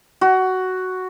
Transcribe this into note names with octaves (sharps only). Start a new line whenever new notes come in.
F#4